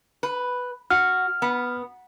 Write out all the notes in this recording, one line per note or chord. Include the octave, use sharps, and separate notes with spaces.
B4
F#4 F6
B3